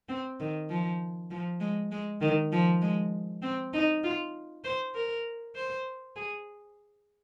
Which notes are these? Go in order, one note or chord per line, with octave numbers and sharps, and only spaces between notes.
C4
D#3
F3
F3
G#3
G#3
D#3
F3
G#3
C4
D#4
F4
C5
A#4
C5
G#4